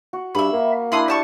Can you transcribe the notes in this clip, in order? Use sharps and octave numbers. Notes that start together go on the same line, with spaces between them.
F#4
G2 E5 B5
A#3
D4 E4 B5 C6 D#6
G4 D5 A5 C#6